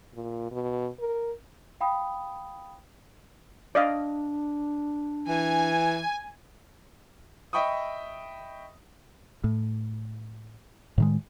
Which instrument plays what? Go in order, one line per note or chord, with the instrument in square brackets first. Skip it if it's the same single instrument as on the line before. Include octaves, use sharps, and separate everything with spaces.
[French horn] A#2
B2
A#4
[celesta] F5 G5 B5 D#6
[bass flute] D4 [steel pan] D5 D#5 F5
[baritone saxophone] E3 [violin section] G#5
[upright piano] D#5 E5 G5 B5 C#6 D#6
[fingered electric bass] A2
A2 D#3 G#3